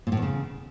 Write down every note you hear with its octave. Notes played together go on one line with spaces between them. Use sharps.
A#2
A2
E2
C#3